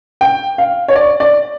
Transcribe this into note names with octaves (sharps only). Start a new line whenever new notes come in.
G5
F5
C#5
D5
D5